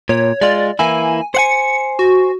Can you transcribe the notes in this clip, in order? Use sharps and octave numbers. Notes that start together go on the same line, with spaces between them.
A#2 C#5
G#3 F4 D5
E3 A#3 E4 G#5
C5 F#5 G#5 C#7
F#4